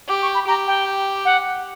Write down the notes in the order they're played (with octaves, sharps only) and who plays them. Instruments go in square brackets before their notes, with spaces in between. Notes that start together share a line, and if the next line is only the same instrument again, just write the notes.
[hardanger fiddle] G4 [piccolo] D6
[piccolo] C#6
B5
[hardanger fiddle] G4 [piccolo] A#5
[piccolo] G5
F#5